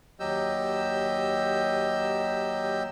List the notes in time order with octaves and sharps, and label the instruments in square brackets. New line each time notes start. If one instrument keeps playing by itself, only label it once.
[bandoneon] D#2 F#3 G4 D#5 E6 G6